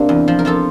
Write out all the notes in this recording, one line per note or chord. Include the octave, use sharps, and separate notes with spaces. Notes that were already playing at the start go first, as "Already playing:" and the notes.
Already playing: C3 A#3 D4
E2
F3
A#4
F3 F4 A4